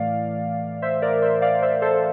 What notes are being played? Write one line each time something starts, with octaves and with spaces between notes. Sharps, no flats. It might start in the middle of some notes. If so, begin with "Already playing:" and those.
Already playing: A2 E3 A3 D5 F5
C5 E5
A#4 D5
C5 E5
D5 F5
C5 E5
A4 C5